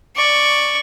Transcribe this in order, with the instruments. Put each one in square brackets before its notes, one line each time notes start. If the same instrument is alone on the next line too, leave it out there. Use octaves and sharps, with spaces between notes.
[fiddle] D5 C#6